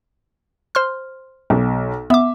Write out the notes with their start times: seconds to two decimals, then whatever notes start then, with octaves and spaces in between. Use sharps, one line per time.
0.75 C5 C6 F6
1.50 B1
2.10 B3 E5 D6